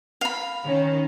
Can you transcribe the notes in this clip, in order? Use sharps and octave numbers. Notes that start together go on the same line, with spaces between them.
F5 B5
D#3 C#4